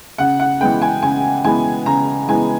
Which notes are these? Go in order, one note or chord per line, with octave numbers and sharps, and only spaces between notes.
C#3 F#5
F#5
E3 G#3 B3 G5
G#5
C#3 G#5
E3 G#3 B3 G#5
C#3 A#5
E3 G#3 B3 G#5